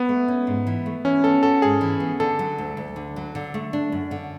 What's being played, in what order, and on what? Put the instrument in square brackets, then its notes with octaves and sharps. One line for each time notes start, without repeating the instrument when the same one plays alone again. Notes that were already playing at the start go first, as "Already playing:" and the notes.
Already playing: [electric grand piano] B3
[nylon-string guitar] A3
C#4
G#2
E3
A3
[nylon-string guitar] E3 [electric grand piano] C#4
[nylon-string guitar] B3 [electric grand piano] A4
[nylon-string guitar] F#4 [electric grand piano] A4
[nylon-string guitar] G#2 [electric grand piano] G#4
[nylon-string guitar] E3
B3
[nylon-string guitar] D3 [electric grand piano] A4
[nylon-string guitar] F#3
D2
D2
D3
F#3
D3
A3
D4
F#2
D3